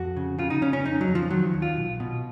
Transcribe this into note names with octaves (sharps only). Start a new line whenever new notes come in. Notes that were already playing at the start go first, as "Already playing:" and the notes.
Already playing: F2 F#4
C#3
C#3 F4
D#4
C#3 C#4
C#4
F2 D#4
F#3
F2
F3
D#3 F#3
D#2
F4
B1
B2